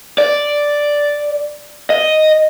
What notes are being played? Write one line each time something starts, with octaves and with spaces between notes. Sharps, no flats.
D5
D#5